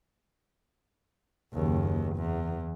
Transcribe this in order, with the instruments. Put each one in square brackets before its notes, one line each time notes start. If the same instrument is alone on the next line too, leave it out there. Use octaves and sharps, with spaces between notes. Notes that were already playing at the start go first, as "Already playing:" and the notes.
[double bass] F#1 D#2
E2